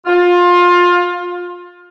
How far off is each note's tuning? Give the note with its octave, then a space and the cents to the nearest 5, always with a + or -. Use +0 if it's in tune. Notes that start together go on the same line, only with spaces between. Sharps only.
F4 +20